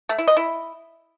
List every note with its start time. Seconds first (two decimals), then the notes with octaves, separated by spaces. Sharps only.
0.09 A3
0.18 E4
0.28 D#5
0.37 E4